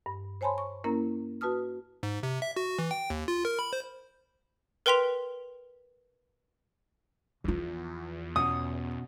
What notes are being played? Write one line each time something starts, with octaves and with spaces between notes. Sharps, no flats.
G2
C5 C#5 G#5 A5 B5 C6
C#6
A#3 C#4 E4 A#4 A#5
F#4 B4 A5 D#6 F6
G#2
C3
E5
F#4
E3
G5
D#2
F4
A#4
B5
C5
A#4 B4 G5 C6 B6 F7
E2 F3 F4
B2 C#4 D#6